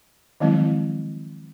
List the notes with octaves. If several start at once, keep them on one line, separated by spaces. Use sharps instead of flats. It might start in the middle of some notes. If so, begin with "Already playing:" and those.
D#3 F3 F#3 G#3 C4 E4